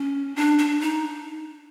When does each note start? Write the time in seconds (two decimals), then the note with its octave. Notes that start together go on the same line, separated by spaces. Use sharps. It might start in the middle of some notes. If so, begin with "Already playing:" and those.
Already playing: C#4
0.36 D4
0.59 D4
0.80 D#4